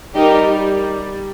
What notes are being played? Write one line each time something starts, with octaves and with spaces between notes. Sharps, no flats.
G3 D#4 G4 A#4